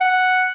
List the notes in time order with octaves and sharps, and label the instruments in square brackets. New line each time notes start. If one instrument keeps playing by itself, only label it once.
[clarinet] F#5